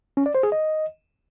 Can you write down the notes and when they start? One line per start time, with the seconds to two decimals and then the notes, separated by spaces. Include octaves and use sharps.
0.17 C#4
0.26 D5
0.35 C5
0.43 G#4
0.52 D#5